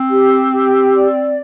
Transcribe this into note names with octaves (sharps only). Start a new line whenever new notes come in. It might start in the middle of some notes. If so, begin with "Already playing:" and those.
Already playing: C4
G4
G4
D5